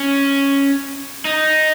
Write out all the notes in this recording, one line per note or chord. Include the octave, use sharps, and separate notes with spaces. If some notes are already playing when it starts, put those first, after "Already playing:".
Already playing: C#4
D#4